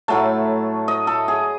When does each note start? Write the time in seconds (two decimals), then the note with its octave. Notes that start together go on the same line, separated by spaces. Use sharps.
0.08 A2 F#3 A3 A5
0.88 D#5
1.07 A4
1.28 G#4